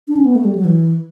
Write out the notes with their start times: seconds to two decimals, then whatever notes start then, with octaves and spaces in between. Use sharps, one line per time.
0.08 D4
0.17 C#4
0.25 B3
0.35 A3
0.45 G3
0.55 F#3
0.65 E3